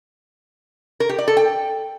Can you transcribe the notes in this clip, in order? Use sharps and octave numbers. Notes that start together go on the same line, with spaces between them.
A#4
G4
D5
A4
G5